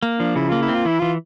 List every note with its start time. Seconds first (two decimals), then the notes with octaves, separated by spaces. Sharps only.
0.03 A#3
0.19 F3 D4
0.36 C#3 E4
0.49 A#3 F4
0.62 E4
0.69 C4
0.74 F4
0.85 E3 E4
0.99 E3 F4